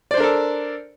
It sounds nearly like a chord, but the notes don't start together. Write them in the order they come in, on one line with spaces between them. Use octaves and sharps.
D5 C5 D4 A#4 A4